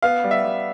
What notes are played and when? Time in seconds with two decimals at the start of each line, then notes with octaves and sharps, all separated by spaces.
0.02 B3 F5
0.24 G3
0.31 E5
0.45 G3